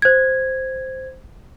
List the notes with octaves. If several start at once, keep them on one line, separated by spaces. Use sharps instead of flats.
C5 G#6